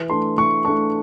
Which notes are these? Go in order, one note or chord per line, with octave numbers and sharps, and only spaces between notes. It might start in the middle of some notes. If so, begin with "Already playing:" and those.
Already playing: E3
A3 D4 C6
E3 C#6
A3 D4 C#6